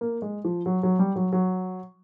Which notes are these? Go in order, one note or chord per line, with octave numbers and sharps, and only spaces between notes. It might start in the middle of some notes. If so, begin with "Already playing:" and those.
A#3
G#3
F3
F#3
F#3
G3
F#3
F#3